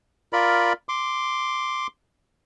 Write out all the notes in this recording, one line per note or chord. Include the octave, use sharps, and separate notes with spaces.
F4 A#4 D5 B5
C6 D6